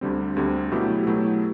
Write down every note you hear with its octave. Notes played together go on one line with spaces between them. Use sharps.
D2 D3 G3 C4
D2 D3 G3 C4
B2 F#3 A3 E4 G4
B2 F#3 A3 E4 G4